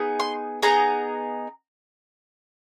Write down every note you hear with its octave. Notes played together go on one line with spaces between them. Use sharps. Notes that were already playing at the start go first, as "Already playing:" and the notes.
Already playing: B3 D#4 G#4
C6
B3 D#4 G#4 A#5